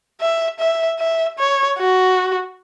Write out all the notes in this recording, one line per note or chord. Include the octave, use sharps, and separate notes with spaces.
E5
E5
E5
C#5
F#4